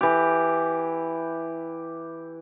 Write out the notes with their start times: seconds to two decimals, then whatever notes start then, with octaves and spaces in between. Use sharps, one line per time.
0.01 E3 G4